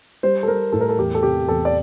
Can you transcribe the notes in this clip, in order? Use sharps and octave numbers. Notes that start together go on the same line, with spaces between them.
G3 C5
A4
G3 A#4
A2 A4
A#4
A4
E2 G4
A4
C3 G4
E2 A4
D5